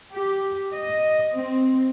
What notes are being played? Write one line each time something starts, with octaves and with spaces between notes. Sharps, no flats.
G4
D#5
C4